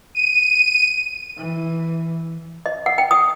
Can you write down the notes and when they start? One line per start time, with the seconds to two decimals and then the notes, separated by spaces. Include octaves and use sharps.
0.15 D#7
1.37 E3
2.66 D#5
2.86 F#5
2.98 G5
3.11 D#6